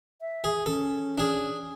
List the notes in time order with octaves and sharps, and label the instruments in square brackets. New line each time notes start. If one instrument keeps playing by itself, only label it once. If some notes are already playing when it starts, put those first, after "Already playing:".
[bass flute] E5
[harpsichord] G#4
[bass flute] C#4 [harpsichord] A4
[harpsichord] D4 G#4